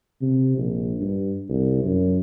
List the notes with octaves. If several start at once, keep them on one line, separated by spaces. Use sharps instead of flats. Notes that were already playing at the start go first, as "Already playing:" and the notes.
C3
A#1
G2
C2
F#2